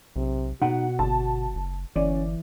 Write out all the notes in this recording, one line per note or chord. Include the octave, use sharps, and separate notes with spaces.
B1 C3
B2 D#4 F#4 F#5
G1 A5
F#1
G1 E3 C#4 D5